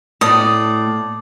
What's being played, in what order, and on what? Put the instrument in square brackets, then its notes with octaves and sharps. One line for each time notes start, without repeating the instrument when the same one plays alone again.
[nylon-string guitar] A2 [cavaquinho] D5 D#6